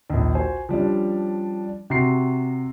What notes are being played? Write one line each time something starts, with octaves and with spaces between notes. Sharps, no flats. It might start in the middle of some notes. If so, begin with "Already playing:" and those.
A#1 D#2
F#4 C5 G#5
F3 G3 C#4 D4
C3 F#4 A#5 C6 C7